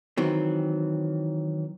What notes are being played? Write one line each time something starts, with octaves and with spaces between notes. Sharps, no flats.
D#3 E3 F#3 C4